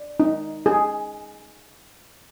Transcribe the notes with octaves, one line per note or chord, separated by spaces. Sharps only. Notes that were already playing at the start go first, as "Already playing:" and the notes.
Already playing: D5
D#4
G#4